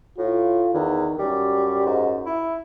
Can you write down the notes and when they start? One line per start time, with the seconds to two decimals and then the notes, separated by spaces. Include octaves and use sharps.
0.18 A2 F4
0.74 E2 D#3
1.19 F#2 G3
1.86 G#2
2.26 E4